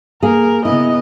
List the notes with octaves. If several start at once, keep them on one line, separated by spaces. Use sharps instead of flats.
A#3 G#4 A#4
C#3 B3 E4 D#5